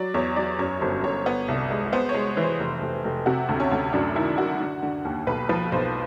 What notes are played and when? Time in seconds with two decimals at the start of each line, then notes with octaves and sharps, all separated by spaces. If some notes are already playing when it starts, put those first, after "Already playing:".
Already playing: F#3 D5
0.14 E2 C#5
0.36 F#3 D5
0.59 F#2 C#5
0.81 G1 C5
1.03 G1 C#5
1.26 B3
1.48 C2
1.71 G#3
1.92 B3 C5
2.09 C#5
2.14 G#3
2.37 E3
2.43 C5
2.60 F1
2.82 F1
3.04 F1
3.26 C3 F#4
3.49 D2
3.60 C#4
3.72 D2
3.93 F#2 D4
4.16 D#3 E4
4.38 D#3 F#4
4.60 D3
4.83 D3
5.05 D#2
5.27 B1 B4
5.49 F3 B4
5.72 B1 C5